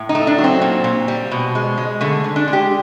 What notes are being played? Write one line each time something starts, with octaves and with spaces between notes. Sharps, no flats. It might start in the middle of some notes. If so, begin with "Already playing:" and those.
Already playing: A2
D#4
A3
D4
F#3
C4
A#2
A#2
G3
B2
G#3
G#3
D3 A3
D3
D4
G#3
G4